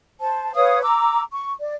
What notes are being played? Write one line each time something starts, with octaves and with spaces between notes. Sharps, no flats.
C5 A5
B4 C#5 F5 D#6
A#5 D6 E6
C#6
D5